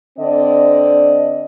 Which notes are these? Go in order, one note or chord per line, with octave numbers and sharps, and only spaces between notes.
D3 C4 D5 D#5